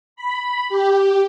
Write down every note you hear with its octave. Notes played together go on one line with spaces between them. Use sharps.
B5
G4